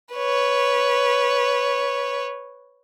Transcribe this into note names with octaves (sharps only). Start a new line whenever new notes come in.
B4 C#5